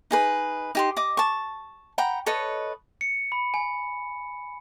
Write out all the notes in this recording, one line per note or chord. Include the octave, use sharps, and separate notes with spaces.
D#4 G#4 B4
D#4 G4 C6
D#5 D6
A5 C#6
F#5 G5 A#5 B5
A4 B4 C#5 D#5
C#7
B5
G#5